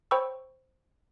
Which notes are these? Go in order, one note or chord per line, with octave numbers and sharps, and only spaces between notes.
C5 C#5 G5 B5 C#6 E6